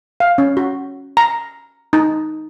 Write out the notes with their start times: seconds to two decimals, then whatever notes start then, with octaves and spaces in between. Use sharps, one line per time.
0.20 F5
0.38 C#4
0.57 F#4
1.17 A#5
1.93 D#4